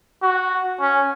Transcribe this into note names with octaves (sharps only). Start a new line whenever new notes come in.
F#4
C#4